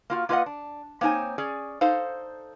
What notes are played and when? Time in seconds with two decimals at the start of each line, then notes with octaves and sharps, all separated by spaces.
0.10 A#3 F4 F#4
0.29 A#3 F4 B4 C5 D#5 F#5
0.46 D4
1.01 A#3 C4 D#4 C#5 G#5
1.38 C#4 G#4 D5
1.81 D#4 A4 C5 F5